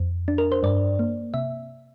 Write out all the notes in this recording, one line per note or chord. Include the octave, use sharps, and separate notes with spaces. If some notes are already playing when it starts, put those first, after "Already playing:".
Already playing: F2
D4
A#4
C5
G2 D5
A#3
C3 E5